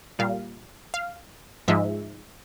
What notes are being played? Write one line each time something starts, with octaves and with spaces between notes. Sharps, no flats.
A#2 G3 F5
F5
G#2 F3 G#3 E5